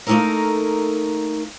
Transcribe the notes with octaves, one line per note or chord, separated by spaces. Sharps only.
A3 A#3 C#4 D#4 A4 A#4